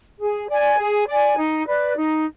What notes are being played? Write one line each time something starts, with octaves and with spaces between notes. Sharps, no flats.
G#4
D5 G#5
G#4
D5 G#5
D#4
B4 D5
D#4